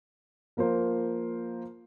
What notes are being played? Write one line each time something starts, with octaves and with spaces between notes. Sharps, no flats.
F3 A#3 A#4 C5